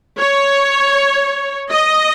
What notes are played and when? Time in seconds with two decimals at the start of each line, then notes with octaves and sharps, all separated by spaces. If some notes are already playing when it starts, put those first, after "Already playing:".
0.19 C#5
1.71 D#5